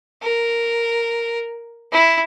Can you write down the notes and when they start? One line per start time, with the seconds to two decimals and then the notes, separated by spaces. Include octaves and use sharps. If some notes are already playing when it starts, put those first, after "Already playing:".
0.23 A#4
1.92 E4